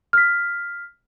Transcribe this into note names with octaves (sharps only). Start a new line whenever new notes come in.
F6 B6